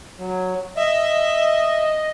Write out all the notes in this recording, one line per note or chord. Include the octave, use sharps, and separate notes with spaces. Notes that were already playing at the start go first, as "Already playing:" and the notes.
F#3
D#5 E5